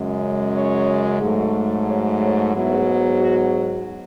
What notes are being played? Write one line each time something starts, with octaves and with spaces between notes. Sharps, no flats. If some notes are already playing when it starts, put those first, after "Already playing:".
Already playing: F#2 C#3 G#3
C#5
G#2 F#3 A3
C#5
C#5
G#2 F#3 B3 E4
F#4